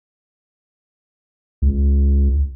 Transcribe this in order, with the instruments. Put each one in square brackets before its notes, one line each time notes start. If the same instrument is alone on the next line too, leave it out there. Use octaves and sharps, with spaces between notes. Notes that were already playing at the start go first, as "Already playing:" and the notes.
[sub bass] C#2